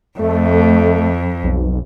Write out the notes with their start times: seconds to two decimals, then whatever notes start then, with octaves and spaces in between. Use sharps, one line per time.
0.19 F2 A3
1.43 B1